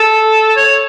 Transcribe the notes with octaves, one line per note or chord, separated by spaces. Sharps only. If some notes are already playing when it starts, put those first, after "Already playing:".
Already playing: A4
C#5